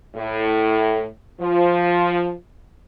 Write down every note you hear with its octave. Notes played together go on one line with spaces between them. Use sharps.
A2
F3